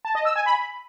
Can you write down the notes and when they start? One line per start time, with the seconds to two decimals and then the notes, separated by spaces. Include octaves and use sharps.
0.05 A5
0.15 D#5
0.25 E6
0.36 G#5
0.46 B5